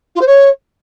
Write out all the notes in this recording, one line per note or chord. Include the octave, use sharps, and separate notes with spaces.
F4
C5
C#5